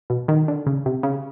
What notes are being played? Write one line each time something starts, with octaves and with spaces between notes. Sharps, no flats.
B2
D#3
D3
C#3
C3
C#3